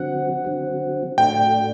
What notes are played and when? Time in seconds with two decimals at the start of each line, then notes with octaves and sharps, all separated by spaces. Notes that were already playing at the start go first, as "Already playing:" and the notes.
Already playing: D3 F#3 C4 F#5
0.45 D3 F#3 C4
1.18 A2 A3 D4 F#4 G5